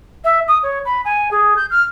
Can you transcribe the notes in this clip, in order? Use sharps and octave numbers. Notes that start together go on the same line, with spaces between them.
E5
D#6
C#5
B5
G#5
G#4
G6
F6